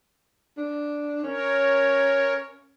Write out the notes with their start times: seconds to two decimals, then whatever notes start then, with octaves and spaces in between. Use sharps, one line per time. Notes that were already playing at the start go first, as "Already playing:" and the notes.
0.57 D4
1.23 C#4 A#4 C#5